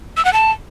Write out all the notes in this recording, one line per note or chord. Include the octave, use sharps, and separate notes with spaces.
E6
F#5
A5